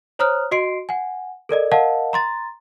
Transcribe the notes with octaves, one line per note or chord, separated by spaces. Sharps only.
C5 C#5 A#5 D#6 F6 F#6
F#4 D#5 C6 C7 D7
F#5 G#5
A4 A#4 D5 D#5
A#4 D#5 F5 F#5 A5
A#5 C6 A6